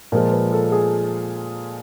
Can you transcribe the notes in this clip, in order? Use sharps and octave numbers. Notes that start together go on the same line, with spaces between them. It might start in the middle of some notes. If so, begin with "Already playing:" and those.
A#2 F3 G#3 A#4
B4
A4
G#4